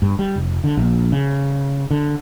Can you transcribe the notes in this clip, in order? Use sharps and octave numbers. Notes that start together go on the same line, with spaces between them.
G2
G3
F1
D3
A#1
C#3
D3